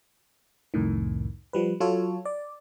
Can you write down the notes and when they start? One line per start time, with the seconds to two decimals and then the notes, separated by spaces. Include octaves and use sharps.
0.74 C2 F2 A2 D#3
1.53 F3 G3 B4
1.80 F#3 F4 A4 C#5
2.25 D5